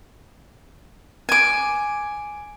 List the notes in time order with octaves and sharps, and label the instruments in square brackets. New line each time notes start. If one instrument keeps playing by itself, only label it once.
[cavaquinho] G#5 D6